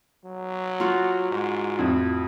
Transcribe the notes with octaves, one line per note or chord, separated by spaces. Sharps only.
F#3
F4 F#4
G#2
F2 A2